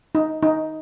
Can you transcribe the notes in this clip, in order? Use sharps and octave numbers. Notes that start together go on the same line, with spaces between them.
D#4
D#4